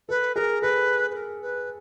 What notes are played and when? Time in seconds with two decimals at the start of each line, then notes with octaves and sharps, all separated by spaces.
0.09 A4 B4
0.35 G#4 A#4
0.62 A4 B4
1.10 B4
1.15 A#4
1.41 B4